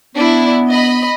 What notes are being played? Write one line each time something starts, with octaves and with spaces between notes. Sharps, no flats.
B3 D4 E4
D#5 B5